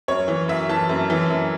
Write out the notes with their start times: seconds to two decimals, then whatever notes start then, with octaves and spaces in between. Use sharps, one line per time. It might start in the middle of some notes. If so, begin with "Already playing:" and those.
0.08 F#2 C#5
0.28 E3
0.48 F#2 E5
0.69 E3 A5
0.89 F#2
1.10 E3
1.30 F#2